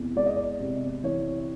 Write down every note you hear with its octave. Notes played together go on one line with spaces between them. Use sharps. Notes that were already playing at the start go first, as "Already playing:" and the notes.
Already playing: E2 C3
G#3 D5
D#5
D5
C3
E3 C#5